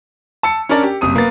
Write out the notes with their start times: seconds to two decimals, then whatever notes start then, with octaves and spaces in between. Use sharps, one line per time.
0.43 A5 E6 C#7
0.69 C#4 D4 A#4 D5 A5
0.83 G4
1.01 F#1 C3 D#6 D#7
1.16 A#3 B3 A6